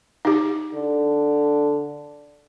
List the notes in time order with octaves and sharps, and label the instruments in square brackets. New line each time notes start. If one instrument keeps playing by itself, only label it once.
[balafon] D#4 G4
[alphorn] D3